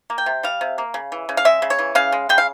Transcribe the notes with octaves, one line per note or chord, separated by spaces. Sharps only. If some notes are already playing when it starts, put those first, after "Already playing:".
A#3
G5
C3
G3 F5
C3
A#3
C#3
E3
C#3
F5
G#3 E5
C#3
C#5
E3
C#3 F5
G#3
C#3 G5
F5